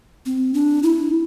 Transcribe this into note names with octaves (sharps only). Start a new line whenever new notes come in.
C4
D4
E4